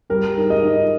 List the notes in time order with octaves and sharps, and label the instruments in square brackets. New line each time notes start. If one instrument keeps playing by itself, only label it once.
[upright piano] G3 A#4
G#2
D#5
D#3